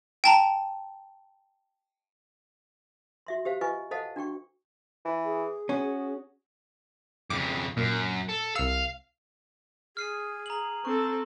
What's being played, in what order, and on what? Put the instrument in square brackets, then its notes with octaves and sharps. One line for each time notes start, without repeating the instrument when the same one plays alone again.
[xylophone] G5 A5 A#5
[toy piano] F#4 E5 C6
G4 C5 F5
F4 B4 D#5 G#5 C#6
A4 C5 D#5 F5 F#5 A5
D4 F#4 G5 C#6
[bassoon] E3
[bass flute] G#4
[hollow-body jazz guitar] C#4 [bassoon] F#4
[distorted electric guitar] F2 C#3 [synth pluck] D6
[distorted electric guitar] F#2 [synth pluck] A#2
[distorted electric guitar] A4
[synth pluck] C2 E6 [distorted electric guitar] F5
[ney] G#4 [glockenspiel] F6 C7 D#7
[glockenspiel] A#5 F#7
[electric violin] C4 A4 [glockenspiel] C#6